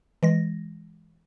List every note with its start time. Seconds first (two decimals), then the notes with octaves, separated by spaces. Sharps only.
0.23 E3 G#3 A#6